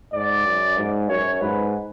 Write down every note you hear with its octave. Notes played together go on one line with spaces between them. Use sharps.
G#2 D5
F#2
G#2
F#2 C#5
G#2 B4